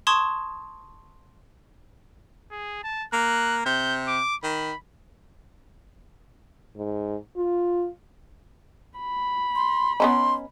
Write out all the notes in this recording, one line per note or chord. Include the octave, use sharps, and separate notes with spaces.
A5 C6 C#6 D#6 G#6 E7
G#4
A5
A#3 F#6
C3 G6
D6
D#3 B5
G#2
F4
B5
C6
B3 C#4 D#4 C6